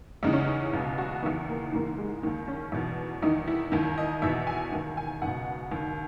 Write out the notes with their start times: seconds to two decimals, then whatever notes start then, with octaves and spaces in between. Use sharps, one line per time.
0.23 E2 C#3 E3 D#4
0.33 C#4
0.44 D#4
0.73 C#2 B2
0.98 F#4
1.22 E2 D#3 B3
1.48 A#3
1.72 G#2 E3 A#3
1.98 G#3
2.23 D#2 D#3 A#3
2.48 C#4
2.72 E2 B2
3.22 E2 D#3 D#4
3.48 E4
3.72 D#2 D#3 E4
3.98 D#5
4.22 E2 B2 E5
4.47 G#5
4.72 D#2 D#3
4.97 G#5
5.22 C#2 B2 F#5
5.72 D#2 D#3